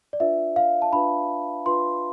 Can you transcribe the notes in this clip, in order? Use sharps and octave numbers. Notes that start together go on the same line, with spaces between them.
D5
D4 F4 B4 E5
F5
A5
D4 F4 B4 B5
D4 F4 B4 C6